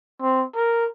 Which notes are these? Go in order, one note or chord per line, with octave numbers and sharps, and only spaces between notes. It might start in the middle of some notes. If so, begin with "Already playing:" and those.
C4
A#4